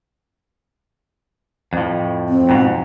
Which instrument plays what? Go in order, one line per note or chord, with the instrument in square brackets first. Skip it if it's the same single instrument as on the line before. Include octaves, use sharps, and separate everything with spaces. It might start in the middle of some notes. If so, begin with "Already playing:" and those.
[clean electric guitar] F2 A2
[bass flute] C4
[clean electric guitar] F2 G#2 B2